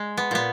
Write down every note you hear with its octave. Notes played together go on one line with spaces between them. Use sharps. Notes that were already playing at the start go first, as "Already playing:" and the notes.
Already playing: G#3
B3
A#2 B3